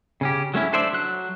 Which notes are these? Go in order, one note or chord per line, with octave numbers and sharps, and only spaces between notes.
C#3 C#4 G4
F#3 A3 C#4 E4
D4 A4 C5 D5 E5
F#3 F#6